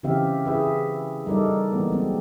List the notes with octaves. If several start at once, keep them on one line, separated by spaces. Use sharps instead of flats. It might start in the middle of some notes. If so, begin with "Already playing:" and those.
C#3 E3 C4 G4 E5 F5
E4 G#4 B4 E5
G3 D#4 A4 A#4 D5
E3 A#3 B3
F#3 G#3 C4